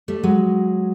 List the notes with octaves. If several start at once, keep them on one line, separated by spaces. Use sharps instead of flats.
G3 A3
F#3 G#3